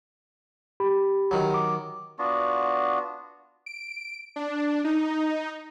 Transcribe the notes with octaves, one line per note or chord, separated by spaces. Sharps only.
G4 B5
D#3 F#3
D6
B3 D4 F4 F#4
D7
D4
D#4